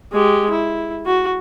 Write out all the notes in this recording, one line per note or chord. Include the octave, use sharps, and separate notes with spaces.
G#3 G4
E4
F#4